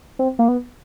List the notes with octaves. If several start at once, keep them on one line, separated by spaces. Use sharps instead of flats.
C4
A#3
B3